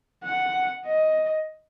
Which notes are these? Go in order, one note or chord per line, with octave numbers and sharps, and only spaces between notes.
F#5
D#5